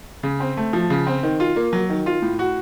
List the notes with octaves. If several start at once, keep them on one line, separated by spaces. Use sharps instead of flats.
C#3
C4
A3
F3
C#3
C4
D#3
F4
A#3
F#3
D#3
F4
A2
F#4